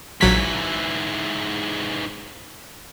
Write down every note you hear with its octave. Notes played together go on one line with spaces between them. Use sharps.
A#1 G#2 E3 F#3 B6